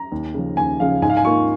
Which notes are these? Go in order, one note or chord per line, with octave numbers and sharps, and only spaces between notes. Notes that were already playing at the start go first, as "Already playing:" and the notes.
Already playing: A#5
D#2
C#3 F3
D#2 G#5
C#3 F3 F5
G#2 G#5
F5
G#5
D#3 A#3 F4 C#6